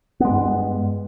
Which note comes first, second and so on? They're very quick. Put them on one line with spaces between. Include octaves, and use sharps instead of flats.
B3 G#3 G2